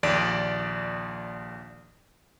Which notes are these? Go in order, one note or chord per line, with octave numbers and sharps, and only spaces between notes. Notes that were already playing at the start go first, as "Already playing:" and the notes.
A#1 D#2 D5 D7